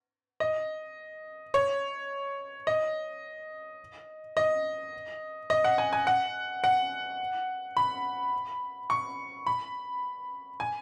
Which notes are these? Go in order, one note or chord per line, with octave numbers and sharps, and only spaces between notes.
D#5
C#5
D#5
D#5
D#5
F#5
G#5
G#5
F#5
F#5
B5
C#6
B5
G#5